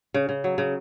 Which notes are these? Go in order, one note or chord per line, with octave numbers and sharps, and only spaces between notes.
C#3
C#3
F#3
C#3